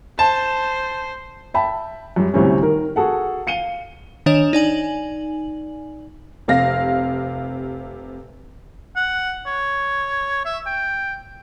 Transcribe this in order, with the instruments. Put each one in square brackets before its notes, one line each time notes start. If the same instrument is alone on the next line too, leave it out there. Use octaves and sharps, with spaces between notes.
[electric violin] C5 [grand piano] A5
[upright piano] E5 G5 A5 B5
F#2 G3
D2 A2 C3 G3 C4 C#4
D#3 A#4
F#4 G#4 A4 F#5
F5 C#7 D#7 G7
[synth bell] D#3 D4 C#5 D#5 E7 F7
D#4 D5 G#5 F#7
[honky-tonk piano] F1 C3 F5 A#6
[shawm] F#5
C#5
E5
G5